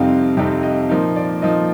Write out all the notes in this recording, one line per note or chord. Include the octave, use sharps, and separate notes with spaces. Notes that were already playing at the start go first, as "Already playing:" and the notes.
Already playing: F2 C3 G3 C4 D#4 F5
F2 C3 G3 C4 D#4
D#5
A#2 F3 A#3 D#4
D5
A#2 F3 A#3 D#4 D#5